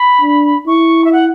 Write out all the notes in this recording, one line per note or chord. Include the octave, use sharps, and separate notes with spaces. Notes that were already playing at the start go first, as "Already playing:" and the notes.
Already playing: B5
D4
E4 C#6
E5
F#5